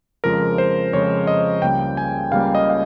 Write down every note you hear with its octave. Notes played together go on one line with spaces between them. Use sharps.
F2 C#3 F3 G#3 A#4
C5
F2 C#3 F3 G#3 C#5
D#5
C#2 C#3 G3 A#3 G5
G#5
C#2 C#3 G3 A#3 F5
D#5
F5